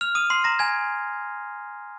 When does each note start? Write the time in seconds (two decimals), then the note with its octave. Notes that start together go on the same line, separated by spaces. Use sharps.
0.01 F6 F7
0.15 D#6 D#7
0.30 C6 C7
0.44 A#5 A#6
0.59 G#5 G#6